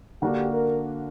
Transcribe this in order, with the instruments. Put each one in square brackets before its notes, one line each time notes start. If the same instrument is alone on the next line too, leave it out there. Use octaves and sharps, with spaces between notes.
[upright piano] D3 A#3 D4 F#4 [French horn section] G4
[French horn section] A#4